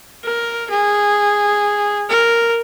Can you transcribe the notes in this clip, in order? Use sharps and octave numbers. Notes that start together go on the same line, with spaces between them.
A#4
G#4
A#4